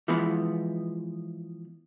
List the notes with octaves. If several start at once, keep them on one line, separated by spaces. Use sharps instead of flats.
E3 F3 G#3 B3